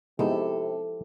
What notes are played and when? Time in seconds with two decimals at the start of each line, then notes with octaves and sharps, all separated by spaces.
0.19 C3 F3 G#3 B3 D#4 E4 G4 A4